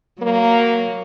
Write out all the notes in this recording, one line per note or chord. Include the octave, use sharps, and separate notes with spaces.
F#3 A#3